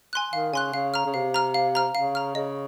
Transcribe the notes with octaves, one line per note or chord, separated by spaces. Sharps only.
G#5 C6 F#6
D#3 F5
C#3 G#5 C6 F#6
C#3 F5
A#5 F6
C#3
C3 F5
A#5 F6
F5
A#5 F6
C#3 F5
A#5 F6
C#3 D#5